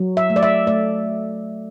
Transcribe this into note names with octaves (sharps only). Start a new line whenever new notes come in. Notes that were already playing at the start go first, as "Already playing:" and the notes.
Already playing: F#3
E5
A3
D5
E5
A3 D5